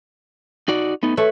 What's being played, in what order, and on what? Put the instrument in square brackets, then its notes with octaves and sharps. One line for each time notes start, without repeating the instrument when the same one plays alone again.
[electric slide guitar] D#4 F#4 D5
A3 B3 D#4
[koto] A3 [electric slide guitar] B4 C#5